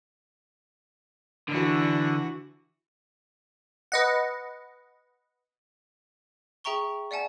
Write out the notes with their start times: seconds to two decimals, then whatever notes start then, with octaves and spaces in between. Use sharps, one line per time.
1.49 D3 E3 F#4
3.92 B4 D#5 F#5
6.64 G#4 E5 G5 A#5 C#6 G7
7.11 D5 E5 F#5 G#5 A5